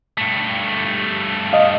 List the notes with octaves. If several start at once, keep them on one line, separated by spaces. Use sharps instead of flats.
G2 A3
D#5 F5